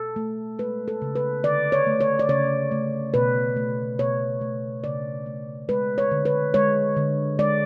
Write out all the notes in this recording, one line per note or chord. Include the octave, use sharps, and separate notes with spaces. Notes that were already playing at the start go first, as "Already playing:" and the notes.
Already playing: B2 A4
A3
G#3 B4
A4
C#3
B4
D3 D5
C#5
A3
C#5
D5
C#3 C#5
A3
B2 B4
A3
B2 C#5
A3
C#3 D5
A3
G#3 B4
C#5
D3
B4
G#3 C#5
D3
G#3 D5